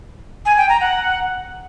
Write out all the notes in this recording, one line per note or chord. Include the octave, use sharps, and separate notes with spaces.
G#5
G5
A#5
F#5